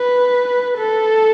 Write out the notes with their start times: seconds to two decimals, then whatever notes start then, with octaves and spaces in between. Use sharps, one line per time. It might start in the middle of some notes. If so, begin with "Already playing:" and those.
Already playing: B4
0.78 A4